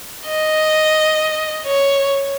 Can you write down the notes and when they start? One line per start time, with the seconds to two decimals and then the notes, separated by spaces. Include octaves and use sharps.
0.27 D#5
1.66 C#5